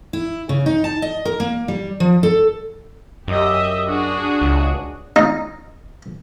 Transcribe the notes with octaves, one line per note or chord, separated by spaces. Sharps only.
E4
C#3
D#4
A5
D#5
A#4
A#3
G3
F3
A4
F#2 G4 D#5 E5
D4 F#4 G#4
C#2
D#4